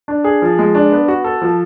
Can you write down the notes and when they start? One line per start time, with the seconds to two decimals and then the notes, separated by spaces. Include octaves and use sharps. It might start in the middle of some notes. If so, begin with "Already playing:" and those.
0.08 D4
0.24 G#4
0.42 F3
0.59 G#3
0.75 D4
0.92 B3
1.08 F#4
1.24 A4
1.42 F3